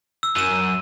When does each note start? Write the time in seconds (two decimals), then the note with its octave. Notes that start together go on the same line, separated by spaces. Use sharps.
0.23 E6
0.36 F#2 D#7 E7